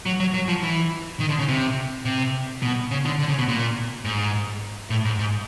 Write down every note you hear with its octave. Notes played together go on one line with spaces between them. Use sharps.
F#3
F#3
F#3
F3
E3
D#3
D3
C#3
C3
C3
B2
C#3
D3
D3
C#3
B2
A#2
G#2
A2
G#2
G#2